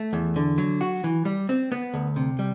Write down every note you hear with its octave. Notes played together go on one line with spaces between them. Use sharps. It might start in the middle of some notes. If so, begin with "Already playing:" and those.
Already playing: A3
E2
D3
F#3
F#4
E3
G3
C4
B3
D2
C3
G3